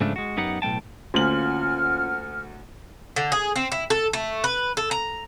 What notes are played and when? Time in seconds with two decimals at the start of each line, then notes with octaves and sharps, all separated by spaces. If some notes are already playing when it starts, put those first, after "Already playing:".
0.01 G#2 C#3 F3 A3 D4
0.16 G#3 F#4
0.37 F#2 B3 D#4 G4 F#5
0.62 B1 A2 A3 G5 A5
1.14 D2 A#3 C#4 F4 F#5 F6 F#7
3.16 D3
3.32 G#4
3.56 C4
3.72 E4
3.90 A4
4.13 A3
4.44 B4
4.77 A4
4.91 A#5